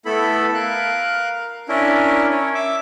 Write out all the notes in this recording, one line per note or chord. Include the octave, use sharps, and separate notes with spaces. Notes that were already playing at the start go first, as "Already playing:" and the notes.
A3 B3 E4 A4 B5
A#4 F5 F#6
C#4 D4 E4 A#4
C#4 C#5
E5 D6